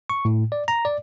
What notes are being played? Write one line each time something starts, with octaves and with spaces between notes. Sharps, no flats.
C#6
A2
D5
A#5
D5